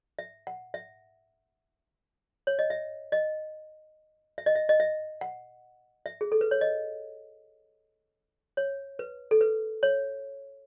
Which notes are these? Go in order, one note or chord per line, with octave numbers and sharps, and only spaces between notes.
E5
F#5
E5
C#5
D#5
E5
D#5
E5
D#5
E5
D#5
E5
F#5
E5
G#4
A4
B4
C#5
D#5
C#5
B4
A4
B4
C#5